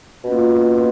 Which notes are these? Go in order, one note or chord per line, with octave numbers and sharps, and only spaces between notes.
B2 A#3 C#4 F4